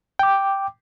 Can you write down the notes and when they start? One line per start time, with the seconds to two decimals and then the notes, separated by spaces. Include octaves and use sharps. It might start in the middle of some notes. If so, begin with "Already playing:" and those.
0.19 G5 D6